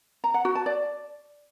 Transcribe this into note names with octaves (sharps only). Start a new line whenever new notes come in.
A#5
F#5
F#4
A5
D5